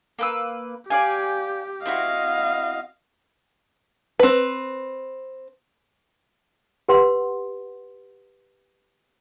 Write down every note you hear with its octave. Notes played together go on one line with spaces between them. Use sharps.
A#3 B4 E6
G4 D5 F5 G#5
C4 E4 F#4 D#5 F5
C4 B4
G4 B4 F#5 C6